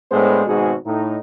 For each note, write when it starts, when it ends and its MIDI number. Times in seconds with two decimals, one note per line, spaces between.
0.12 0.42 45
0.12 0.42 56
0.12 0.42 59
0.12 0.42 62
0.12 0.42 72
0.47 0.74 32
0.47 0.74 44
0.47 0.74 47
0.47 0.74 56
0.47 0.74 66
0.47 0.74 68
0.86 1.18 45
0.86 1.18 63